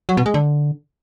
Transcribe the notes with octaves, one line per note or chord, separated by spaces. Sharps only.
F#3
B2
G#3
D3